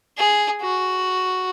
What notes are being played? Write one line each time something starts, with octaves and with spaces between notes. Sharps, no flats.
G#4
F#4